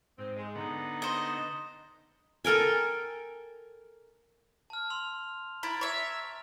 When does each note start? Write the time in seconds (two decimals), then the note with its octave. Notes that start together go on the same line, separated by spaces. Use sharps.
0.18 G#2 C4
0.36 G#3
0.55 D3 B3 D#4 F#5
1.02 C5 D#5
2.44 A4 A#4 G5 G#5
4.70 A5 F6
4.90 C6 E6 F7
5.63 E4 A#5 A6 D7
5.81 C#5 E5